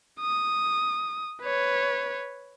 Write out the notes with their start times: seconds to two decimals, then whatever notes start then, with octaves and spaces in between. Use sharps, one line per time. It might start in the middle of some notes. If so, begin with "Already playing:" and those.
0.20 D#6
1.42 B4 C#5